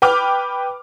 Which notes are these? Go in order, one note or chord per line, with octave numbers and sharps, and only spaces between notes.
B4 G5 B5 D6 F6